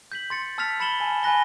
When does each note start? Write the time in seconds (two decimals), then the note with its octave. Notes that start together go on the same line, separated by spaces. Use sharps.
0.12 G6 B6 F#7
0.30 C6 A6 C#7
0.58 A5 E6 F6 A6 B6 F7
0.80 B5 A6 C#7 E7 F#7 G7
1.00 G#5 A5
1.23 G#5 B5 F#6 A#6 G7